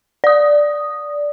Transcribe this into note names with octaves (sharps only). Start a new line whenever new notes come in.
D5 D#6